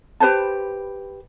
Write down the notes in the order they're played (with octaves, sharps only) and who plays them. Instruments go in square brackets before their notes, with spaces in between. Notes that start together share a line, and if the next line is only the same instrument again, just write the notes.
[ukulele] G4 B4 C5 A5